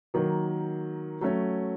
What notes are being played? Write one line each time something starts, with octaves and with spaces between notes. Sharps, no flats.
D#3 F#3 A#3
F#3 A3 C#4